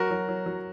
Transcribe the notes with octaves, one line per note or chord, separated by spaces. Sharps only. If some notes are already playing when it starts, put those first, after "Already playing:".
Already playing: F#3 F#4 A#4
F#3
F#3
F#3